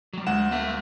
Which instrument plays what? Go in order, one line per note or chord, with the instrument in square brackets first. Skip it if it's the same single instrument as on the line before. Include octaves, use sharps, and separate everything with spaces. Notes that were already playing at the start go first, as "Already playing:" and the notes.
[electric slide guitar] F#3 G3
[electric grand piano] D2 F#5 E7 [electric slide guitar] G#3
[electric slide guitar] A#3 E5